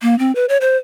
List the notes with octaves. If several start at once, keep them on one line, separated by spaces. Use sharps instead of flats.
A#3
C4
B4
C#5
C5